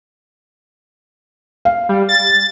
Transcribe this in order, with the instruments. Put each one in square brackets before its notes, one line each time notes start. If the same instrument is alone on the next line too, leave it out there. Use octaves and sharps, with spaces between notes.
[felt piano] F5
[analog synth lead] G3
A6